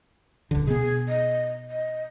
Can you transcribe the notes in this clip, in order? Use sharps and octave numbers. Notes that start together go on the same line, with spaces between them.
D#1 C#2 D3
B2 B3 G#4
D#5
D#5